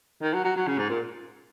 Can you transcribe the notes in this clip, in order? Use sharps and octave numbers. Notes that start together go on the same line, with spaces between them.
D#3
F#3
F#3
F#3
C#3
G#2
A#2